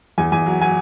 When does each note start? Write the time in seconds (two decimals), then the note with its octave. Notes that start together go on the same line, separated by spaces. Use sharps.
0.18 E2 G#5
0.32 E2 G#5
0.46 F#3
0.61 F#3 G#5